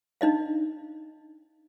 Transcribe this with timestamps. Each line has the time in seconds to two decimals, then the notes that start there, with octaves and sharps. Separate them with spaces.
0.21 D4 D#4 D#5 F5